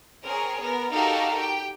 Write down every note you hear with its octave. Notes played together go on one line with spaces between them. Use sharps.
C4 G#4 A#4 C#5
B3 A#4
D#4 F#4 G4 A4 A#4 F5
G4 G5